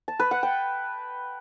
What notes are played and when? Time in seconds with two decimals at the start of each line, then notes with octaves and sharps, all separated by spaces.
0.08 A5
0.20 B4
0.31 F#5
0.43 G5